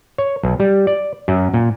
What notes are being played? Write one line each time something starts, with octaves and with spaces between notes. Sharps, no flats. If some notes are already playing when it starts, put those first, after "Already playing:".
C#5
B1
G3
D5
F#2
A#2